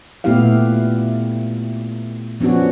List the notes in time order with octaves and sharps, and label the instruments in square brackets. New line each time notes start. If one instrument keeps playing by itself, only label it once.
[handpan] A#2 A3 B3 E4 G4 F5
F3 B3 C#4 D4 F#4